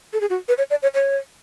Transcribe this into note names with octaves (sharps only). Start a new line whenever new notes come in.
A4
G#4
F#4
B4
C#5
D5
C#5
C#5